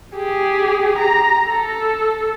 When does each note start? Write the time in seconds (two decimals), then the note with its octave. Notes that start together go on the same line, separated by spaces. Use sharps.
0.16 G4 G#4
0.98 A#5
1.49 A4